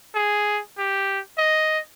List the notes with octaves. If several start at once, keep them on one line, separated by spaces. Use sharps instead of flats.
G#4
G4
D#5